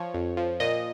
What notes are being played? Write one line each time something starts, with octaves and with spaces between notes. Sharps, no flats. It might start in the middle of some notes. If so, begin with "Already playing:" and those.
Already playing: F3 C#5
F2
F3
A#2 D#5